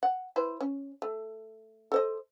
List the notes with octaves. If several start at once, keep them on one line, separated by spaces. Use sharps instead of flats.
F#5
E4 B4 C5
C#4
A3
A4 C5 D#5